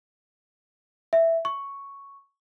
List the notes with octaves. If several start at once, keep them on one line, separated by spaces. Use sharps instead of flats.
E5
C#6